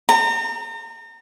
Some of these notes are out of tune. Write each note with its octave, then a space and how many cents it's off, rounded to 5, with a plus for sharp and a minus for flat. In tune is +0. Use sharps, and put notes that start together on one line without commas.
A#5 -35